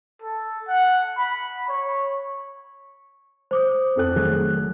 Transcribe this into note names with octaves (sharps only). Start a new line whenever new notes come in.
A4
F#5
B5
C#5
C5 D6 D#6
F2 A4 F#6
D#3 F#3 A3 G#4 F#6